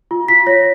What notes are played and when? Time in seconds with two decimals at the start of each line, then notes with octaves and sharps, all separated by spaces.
0.11 F4
0.28 F4 B6
0.47 C#5 A#6